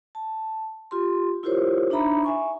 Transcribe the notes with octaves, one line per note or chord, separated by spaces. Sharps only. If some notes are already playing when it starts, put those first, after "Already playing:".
A5
F4 G4 C6
E4 F4 G4 A#4 C5 C#5
D4 D#4 E5 A#5 B5
E5 G#5 C#6